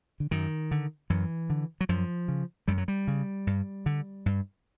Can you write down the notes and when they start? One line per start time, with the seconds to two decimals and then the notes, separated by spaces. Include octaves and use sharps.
0.20 D3
0.31 F#2 D#3
0.71 D3
1.10 F#2 E3
1.50 D3
1.81 F#3
1.89 F#2 F3
2.28 C#3
2.68 F#2 G3
2.78 F#3
2.88 G3
3.07 C#3
3.47 G2
3.86 D3
4.26 G2